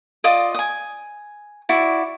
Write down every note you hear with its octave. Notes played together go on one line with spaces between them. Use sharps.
F4 D5 D#5 D#6
G#5 D#6
E4 F#4 D5